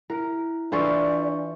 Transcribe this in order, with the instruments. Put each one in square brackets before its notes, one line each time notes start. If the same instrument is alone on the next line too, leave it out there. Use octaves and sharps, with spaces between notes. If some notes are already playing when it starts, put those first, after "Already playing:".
[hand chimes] E4 [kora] A#4
[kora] E3 F4 A4 [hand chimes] D4 C#6 [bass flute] D5